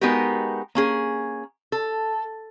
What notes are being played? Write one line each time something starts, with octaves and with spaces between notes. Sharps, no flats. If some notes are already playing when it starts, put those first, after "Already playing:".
G#3 B3 D#4 F#4 G4 A#4
A#3 C#4 G#4
A4